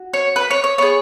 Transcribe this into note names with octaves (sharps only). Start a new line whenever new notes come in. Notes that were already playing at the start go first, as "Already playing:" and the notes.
Already playing: F#4
C#5
B4
C#5
C#5
B3 G#4 C#5